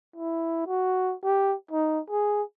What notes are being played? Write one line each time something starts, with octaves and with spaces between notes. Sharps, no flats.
E4
F#4
G4
D#4
G#4